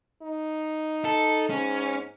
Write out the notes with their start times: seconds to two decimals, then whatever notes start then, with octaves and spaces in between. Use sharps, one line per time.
0.22 D#4
1.05 A4
1.50 G#2 C#4